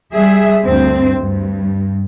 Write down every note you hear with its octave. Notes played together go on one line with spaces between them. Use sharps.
G3 G#4 E5
D2 G2 C4
G2